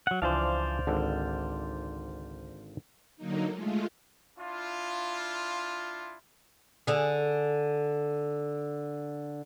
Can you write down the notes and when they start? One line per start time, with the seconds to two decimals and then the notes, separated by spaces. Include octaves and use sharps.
0.07 F#3 F#5
0.22 C#2 C#3 E3 F3 D4 C5 D5 F5
0.87 G#1 D3
3.17 D3 F#3 A#3 D#4
3.52 G#3 A3 F4
4.37 D4 E4 F4
6.87 D3 G#4